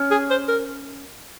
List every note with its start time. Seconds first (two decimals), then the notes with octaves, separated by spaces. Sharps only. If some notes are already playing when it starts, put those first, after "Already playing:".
Already playing: C#4
0.11 G#4
0.30 C5
0.48 A#4